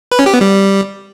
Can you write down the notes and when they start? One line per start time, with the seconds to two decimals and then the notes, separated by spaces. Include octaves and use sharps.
0.12 B4
0.19 C#4
0.26 G4
0.34 B3
0.41 G3